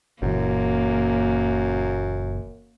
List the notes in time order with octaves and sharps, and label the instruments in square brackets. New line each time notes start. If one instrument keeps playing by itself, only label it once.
[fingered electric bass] F#1 A#2 E3 [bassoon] F#2 [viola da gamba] A#3